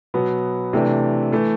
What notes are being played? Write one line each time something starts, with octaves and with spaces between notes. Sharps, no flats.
B2 F#3 B3
C3 E3 A3 D4
E3 A3